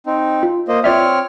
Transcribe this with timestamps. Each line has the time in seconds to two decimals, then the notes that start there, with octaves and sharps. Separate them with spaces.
0.06 C4 D#4
0.43 F4
0.68 A#3 C5 D#5
0.84 C4 F4 C#5 D5 E5 F6